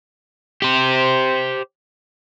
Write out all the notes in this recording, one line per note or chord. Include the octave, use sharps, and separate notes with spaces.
G4 C5